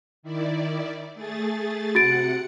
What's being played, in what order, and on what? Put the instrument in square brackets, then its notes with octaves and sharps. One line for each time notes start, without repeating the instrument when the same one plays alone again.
[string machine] D#3 E4 D5
A3 G#4 A6
[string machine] C3 F#5 C#7 [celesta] F#4 A6 D7